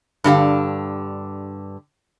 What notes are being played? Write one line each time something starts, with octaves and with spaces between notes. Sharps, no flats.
G2 D3 G4 F5